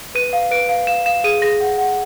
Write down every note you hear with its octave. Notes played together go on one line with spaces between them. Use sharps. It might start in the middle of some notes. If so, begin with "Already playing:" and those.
B4 D#7
F5
B4 D7
F5
F5 E7
F5 E7
G#4 D#7
G#4 A#6
F#5
F#5